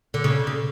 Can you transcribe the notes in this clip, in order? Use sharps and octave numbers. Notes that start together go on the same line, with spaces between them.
D3
C#3
C#3